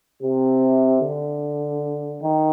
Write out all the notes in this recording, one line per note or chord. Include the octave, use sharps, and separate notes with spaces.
C3
D3
D#3